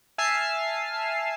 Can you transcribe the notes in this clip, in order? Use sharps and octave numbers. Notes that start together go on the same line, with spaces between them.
E5 G#5 A5 E6 F6 C7